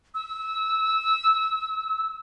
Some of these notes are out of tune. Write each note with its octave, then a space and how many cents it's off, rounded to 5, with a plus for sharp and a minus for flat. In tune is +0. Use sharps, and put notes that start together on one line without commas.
E6 -25